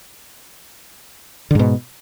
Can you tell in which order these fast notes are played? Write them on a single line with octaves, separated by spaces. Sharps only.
D3 G#2 B2